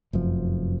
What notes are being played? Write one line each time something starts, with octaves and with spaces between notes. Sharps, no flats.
F1 F#2 F3